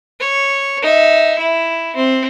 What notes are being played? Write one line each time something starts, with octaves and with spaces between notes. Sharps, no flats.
C#5
D#4 E5
E4
C4